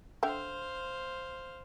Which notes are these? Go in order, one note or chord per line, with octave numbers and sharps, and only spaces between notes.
D3 C5 E5 F5 G5